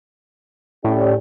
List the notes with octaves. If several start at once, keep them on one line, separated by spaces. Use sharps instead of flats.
A2 C#4 G4 D5